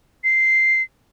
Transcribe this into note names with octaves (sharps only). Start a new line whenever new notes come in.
C7